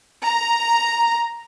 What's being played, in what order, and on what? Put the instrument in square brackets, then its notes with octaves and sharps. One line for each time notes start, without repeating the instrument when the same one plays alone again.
[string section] A#5